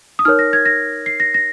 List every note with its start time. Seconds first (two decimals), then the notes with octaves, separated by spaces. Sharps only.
0.19 D#6
0.25 D#4 A#4 C#5 F6
0.39 A#6
0.53 G#6
0.66 A#6
1.06 C7
1.20 A#6
1.34 A#6